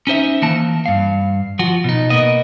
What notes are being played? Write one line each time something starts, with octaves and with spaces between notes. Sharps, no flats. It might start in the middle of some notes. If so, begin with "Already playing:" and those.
C#4 D#4 C5 E5
E3 A#3 A5
G2 F5
F3 F#4
B2 D#4
B2 A#3 B3 D#5